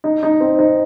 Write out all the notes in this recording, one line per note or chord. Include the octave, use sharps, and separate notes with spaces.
D#4
D#4
C4
D#4